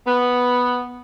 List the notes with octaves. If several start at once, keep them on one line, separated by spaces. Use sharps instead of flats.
B3